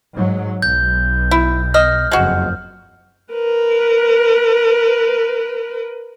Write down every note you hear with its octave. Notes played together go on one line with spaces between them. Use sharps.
G#2 F#3
B1 G6
E4
D#5 F6
F#1 F2 G#3 F#4
A#4 B4